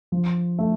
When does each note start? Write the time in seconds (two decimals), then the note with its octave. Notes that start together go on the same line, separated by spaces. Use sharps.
0.12 F3
0.59 A3